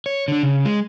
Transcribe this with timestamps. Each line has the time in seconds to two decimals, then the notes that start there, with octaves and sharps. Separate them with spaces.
0.06 C#5
0.28 D3 D4
0.43 C#3
0.65 G#3